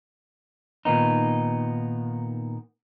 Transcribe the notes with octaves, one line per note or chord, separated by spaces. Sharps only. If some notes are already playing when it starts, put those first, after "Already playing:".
A#2 D#3 B3 D#4